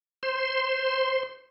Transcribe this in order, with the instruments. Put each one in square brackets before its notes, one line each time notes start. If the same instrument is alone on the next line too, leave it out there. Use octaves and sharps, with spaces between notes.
[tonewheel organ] C5 C6